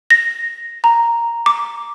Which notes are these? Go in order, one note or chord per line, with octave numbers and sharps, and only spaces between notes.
A#6
A#5
D6